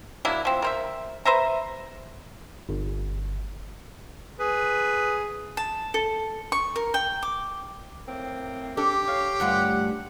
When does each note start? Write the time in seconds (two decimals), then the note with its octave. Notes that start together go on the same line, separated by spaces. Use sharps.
0.25 F#3 A#3 D4 E4
0.45 F3 C4
0.62 A#4 C5 E5
1.25 B4 C5 E5 A#5
2.69 G1
4.40 G#4 B4
5.57 A5
5.94 A4
6.52 C#6
6.76 A#4
6.94 G5
7.23 D6
8.07 A2 A#3 C4
8.77 D4 G4 A4
9.08 C#5 F5
9.40 D2 G2 F4 F#5